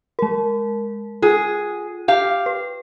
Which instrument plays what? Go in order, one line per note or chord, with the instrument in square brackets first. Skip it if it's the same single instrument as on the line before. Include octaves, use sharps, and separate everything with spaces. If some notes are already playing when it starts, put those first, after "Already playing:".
[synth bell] G#3 A#4
[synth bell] F4 [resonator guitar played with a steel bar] G#4
[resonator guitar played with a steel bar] G4 F5
[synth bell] B4